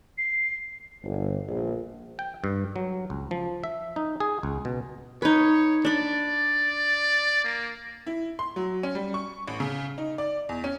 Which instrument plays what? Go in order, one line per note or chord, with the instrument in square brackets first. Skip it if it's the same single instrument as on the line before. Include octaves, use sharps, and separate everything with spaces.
[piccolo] C7
[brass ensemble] G1
A#1
[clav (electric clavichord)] G5
G2
F#3
C#2
F3
E5
D#4
G#4
C#2
B2
[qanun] D#4 B4 [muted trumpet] C#5
[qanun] D4 B5 [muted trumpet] D5
[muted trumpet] A#3
[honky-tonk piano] E4
C6
F#3
C#4
G3
C#6
A1
C#3
D#4
D5
E2
C#4